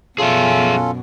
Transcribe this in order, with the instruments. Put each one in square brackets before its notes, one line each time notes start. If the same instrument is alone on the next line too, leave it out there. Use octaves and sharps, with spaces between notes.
[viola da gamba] F#2 B2 [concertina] C#4 F4 A4 [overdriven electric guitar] G#4 E5